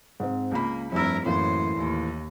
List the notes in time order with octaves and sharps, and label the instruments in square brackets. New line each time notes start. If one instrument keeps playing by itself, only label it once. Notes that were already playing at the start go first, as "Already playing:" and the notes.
[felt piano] G#2 C4
[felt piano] C#2 B5 [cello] A#3
[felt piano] F1 G2 E6 [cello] E4 A#4
[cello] F#2 C5 [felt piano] A2 E3 A#3
[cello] D#2